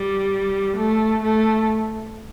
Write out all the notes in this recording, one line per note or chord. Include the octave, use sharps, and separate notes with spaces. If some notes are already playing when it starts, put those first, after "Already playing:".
Already playing: G3
A3
A3